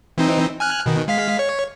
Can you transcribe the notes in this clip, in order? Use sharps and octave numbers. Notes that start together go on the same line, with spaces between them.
E3 C4 D#4
G#5 F6 F#6
B2 D#3
G#3 F5 B6
C#5